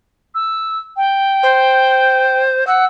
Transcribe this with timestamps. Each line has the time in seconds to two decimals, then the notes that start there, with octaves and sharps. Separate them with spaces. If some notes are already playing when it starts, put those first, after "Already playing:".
0.35 E6
0.97 G5
1.43 C5
2.67 F#5 E6